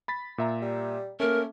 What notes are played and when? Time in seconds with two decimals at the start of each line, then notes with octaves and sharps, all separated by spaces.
0.08 B5 A6 B6
0.38 A#2 E5 A#5
0.61 G3
1.20 A3 A#3 C#4 A#4